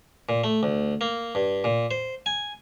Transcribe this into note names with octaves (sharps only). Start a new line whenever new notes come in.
A#2
A3
D2
A#3
G2
A#2
C5
G#5